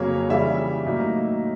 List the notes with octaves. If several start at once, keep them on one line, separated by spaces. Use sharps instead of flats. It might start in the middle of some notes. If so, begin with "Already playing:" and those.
Already playing: F2 C#3 F#3 A#3 C#4 C#5
C#3 E3 G3 E5
A2 F#3 A#3 D#4